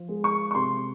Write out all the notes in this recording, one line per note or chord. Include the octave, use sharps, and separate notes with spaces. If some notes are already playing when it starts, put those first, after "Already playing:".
Already playing: F3
G#3
C#6
C#6
C3 C6